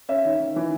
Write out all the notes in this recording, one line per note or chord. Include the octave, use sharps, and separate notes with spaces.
C#4 E5
D#3
D#3
E3